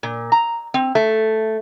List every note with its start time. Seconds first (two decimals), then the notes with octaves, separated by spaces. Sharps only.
0.03 A#2
0.32 A#5
0.74 C4
0.95 A3